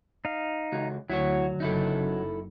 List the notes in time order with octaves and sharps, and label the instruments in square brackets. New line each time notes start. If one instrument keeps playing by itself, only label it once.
[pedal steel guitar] D#4 F5
[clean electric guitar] C#2 F#4
[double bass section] D2 D3 [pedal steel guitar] F#3 [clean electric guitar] E4 F#4 C#5
[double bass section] F#1 F#2 [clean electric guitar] D#4 E4 A4